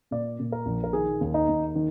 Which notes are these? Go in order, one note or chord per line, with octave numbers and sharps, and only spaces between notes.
A#2 D5
A#2
A#4
A#1
A#4
D#3 G#4
D#2
D#4
D#2
D#3